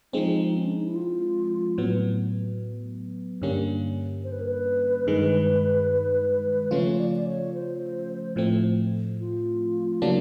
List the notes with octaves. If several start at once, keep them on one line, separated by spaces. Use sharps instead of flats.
F3 G#3 C4 D#4
C#4
D4
D#4
E4
F4
A2 F#3 B3
G2 D3 G3 A#3 C#4
C5
B4
A#4
B4
G2 D#3 G#3
C#3 F3 A3 C#4 F4 C#5
D5
D5
C#5
C5
A2 F3 A3 C4
F4
C#3 F#3 A#3 D4 E4